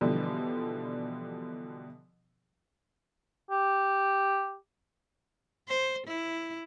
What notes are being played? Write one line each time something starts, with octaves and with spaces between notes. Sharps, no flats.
B2 D3 E3 F3 G3
G4
C5
E4